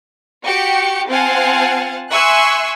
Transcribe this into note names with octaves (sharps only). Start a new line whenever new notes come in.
F#4 G4 G5 C#7
C4 F4 F5 F#5 G#5 A5
E5 G#5 C6 C#6 E6 F#6